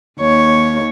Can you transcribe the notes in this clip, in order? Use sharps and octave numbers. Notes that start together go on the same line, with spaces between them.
D#2 C#5